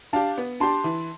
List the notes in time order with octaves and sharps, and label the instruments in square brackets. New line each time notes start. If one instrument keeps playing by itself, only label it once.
[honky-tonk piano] D4 G4 [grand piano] F5 A5
[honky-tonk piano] B3
[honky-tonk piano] D4 G4 [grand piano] A5 C6
[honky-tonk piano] E3